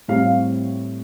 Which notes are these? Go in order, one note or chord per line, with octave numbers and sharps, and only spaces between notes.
A2 G3 C4 F5